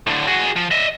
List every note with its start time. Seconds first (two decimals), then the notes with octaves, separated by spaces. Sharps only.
0.07 A2 D3
0.27 F#4 G#4
0.56 F3
0.71 D#5 E5